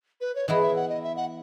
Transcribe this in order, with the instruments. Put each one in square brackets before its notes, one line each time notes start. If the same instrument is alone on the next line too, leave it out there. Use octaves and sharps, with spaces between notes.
[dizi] B4
C#5
[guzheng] E3 B3 E4 G#4 [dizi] D#5
[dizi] E5
F#5
D#5
E5
F#5